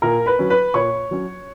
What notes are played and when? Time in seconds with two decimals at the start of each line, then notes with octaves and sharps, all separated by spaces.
0.02 A#2 A#4 A#5
0.26 B4 B5
0.39 F#3 C#4
0.50 B4 B5
0.74 A#2 C#5 C#6
1.11 F#3 C#4